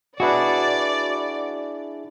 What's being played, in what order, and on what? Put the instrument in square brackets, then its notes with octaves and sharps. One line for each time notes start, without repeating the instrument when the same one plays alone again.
[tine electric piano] D4 E4 G#4 [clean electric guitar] F#4 B4 [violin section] D5